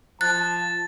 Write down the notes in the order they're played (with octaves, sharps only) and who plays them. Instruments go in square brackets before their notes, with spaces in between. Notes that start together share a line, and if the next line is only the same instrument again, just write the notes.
[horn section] F3 [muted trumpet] A5 [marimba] F#6 [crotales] A6